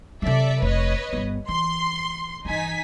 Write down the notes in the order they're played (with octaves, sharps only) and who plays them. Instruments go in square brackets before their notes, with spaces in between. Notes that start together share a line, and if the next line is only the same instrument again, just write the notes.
[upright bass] C3 F#3 [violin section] A4 D5 E5
[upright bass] F1 [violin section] B4 C#5 D#5
[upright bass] G1 B3
[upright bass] E3 [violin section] C6
[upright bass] G2 E3 [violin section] D#4 G#5 B6